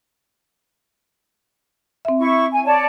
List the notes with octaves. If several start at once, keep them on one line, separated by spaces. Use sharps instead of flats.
C4 E5
E4 C#6
G#5
C#5 D5 A5